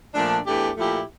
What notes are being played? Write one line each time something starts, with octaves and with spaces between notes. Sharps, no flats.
A#2 F3 A3 D4
E2 E3 A3 D4 G4
A#2 F3 A3 E4 G4